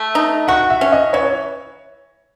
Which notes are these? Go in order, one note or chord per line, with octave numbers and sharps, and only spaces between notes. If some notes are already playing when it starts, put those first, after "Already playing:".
Already playing: A3
D#4
F#4 F#5
E5
C#4
D#5
E3 C#5